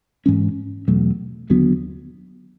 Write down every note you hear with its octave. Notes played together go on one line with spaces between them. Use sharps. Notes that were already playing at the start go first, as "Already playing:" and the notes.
G#2 E3 G#3 C#4
E2 B2 F#3 A3
D#2 D3 F#3 B3